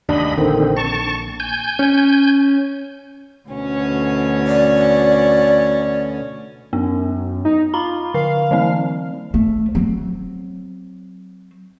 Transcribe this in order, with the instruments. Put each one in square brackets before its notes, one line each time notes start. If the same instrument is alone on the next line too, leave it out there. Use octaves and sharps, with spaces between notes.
[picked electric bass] F1 D#2 D4 [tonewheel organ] D#5 B5
[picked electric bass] A#1 [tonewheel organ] D3 D#3 C4
[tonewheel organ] A5 C#6
G#5 G6
[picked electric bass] C#4
[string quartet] D2 B2 C#4
[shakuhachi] D5
[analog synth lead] F#2 [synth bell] B3
[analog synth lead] D#4
[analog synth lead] F4 [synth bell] A#5 B5
[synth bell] D3 [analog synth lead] F5
[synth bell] E3 F#3 C4
[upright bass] A3
F#3 C4